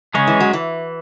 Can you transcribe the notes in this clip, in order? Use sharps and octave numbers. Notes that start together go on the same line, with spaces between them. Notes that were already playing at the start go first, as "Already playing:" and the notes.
C#3 G#3 C#4 G#4 C#5
E3
F#3
E3